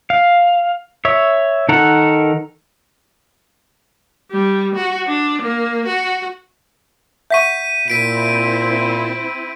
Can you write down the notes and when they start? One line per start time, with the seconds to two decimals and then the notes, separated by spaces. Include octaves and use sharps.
0.10 F5
1.05 C#5 E5
1.69 D#3 A4 A#4 F#5
4.31 G3
4.75 F#4
5.07 D4
5.42 A#3
5.86 F#4
7.30 E5 F#5 C#6 G6 B6 D#7
7.88 A#2 C4 E4 B6 D7 D#7